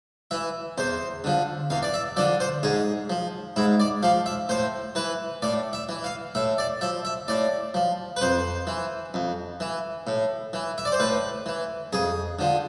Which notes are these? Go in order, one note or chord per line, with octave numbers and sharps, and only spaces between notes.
E3 E5
E2 C5
D3 F3
E2 F5
D5
E5
D3 F3 D5
C5
G#2 G#4
F3
G#2 E4
D5
F3 F5
E5
A2 C5
E3 B4
A2 D5
E5
E3
F5
A2 E5
D5
F3 E5
E5
A2 D5
F3
B4
F2 C5
E3
F2
E3
A2
E3
E5
D5
C5
A2 B4
E3
F2 G#4
D3 F3